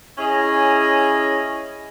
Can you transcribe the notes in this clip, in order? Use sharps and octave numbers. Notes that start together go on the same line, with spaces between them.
C#4 E4 G#4 C#5 D#5